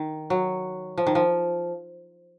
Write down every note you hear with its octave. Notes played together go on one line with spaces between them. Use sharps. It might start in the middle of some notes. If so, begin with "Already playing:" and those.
Already playing: D#3
F#3
F3
D#3
F3